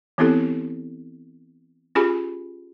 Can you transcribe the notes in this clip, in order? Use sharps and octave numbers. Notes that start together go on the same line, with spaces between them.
E3 B3 C4 E4 G4 A4
C#4 F4 G4 G#4 G#5 B5